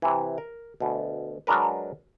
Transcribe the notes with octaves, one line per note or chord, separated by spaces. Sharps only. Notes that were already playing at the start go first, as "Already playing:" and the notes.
C3 E3
A#4
D2 B2
F#3 G#3 D4 A#4 B4